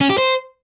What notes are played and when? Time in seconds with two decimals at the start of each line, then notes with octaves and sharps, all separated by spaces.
0.01 C#4
0.10 G4
0.18 C5